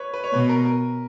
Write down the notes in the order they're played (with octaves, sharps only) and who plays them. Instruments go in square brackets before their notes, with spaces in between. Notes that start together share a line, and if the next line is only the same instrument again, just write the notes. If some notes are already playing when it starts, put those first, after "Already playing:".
Already playing: [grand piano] B4 C#5
B4
C#5
[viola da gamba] B2 [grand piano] B4
[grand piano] A#4
A#4